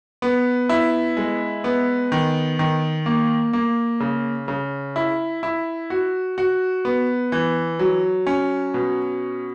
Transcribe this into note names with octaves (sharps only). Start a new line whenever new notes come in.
B3
E4
G#3
B3
D#3
D#3
A#3
A#3
C#3
C#3
E4
E4
F#4
F#4
B3
E3
F#3
C#4
B2